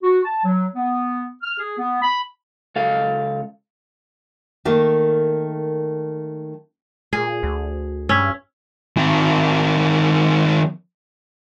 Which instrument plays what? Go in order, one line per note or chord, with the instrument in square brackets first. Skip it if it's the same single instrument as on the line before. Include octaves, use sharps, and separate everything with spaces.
[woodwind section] F#4
A5
F#3
B3
F6
G#4
B3
B5
[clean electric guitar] C#2 A4 F5
[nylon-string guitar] D#3 A3 A#3
[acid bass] A#2 [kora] G#4
[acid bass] D2
[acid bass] G2 [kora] C#4 [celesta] E6 G#6 B6
[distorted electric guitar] D#3 C4